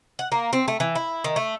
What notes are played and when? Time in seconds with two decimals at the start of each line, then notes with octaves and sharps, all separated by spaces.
0.19 F#5
0.32 A#3
0.53 C4
0.68 A3
0.80 E3
0.95 E4
1.24 D#3
1.36 A3